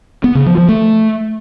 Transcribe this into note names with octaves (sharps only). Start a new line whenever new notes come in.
B3
C#3
F3
F3
A3